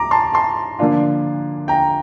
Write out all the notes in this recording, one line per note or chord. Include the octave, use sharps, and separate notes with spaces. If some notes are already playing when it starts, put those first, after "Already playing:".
Already playing: A#5 D6
A5 C6
A5 C6
D3 F3 A#3 D4 F4
G5 A#5